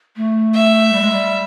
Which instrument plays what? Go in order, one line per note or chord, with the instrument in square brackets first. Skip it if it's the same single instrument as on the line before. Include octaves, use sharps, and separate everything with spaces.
[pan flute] A3
[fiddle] E5
[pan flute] G3
G#3
G3